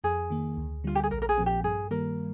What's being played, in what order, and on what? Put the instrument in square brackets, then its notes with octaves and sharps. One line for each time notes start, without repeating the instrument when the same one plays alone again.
[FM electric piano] F2 [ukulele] G#4
[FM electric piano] D#3 A#3
D2
[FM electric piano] D3 G3 [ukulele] F4
[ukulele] G4
G#4
[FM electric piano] A#1 [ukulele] A#4
[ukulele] A#4
G#4
[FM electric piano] A#2 F3 C4
[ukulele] G4
[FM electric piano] G2 [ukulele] G#4
[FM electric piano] D#3 G3 A#3 [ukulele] A#4